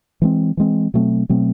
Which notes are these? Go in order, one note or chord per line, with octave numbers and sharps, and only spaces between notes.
E3 G#3 C4
E3 G#3 C4
B2 F#3 A3 C4
B2 F#3 A3 C4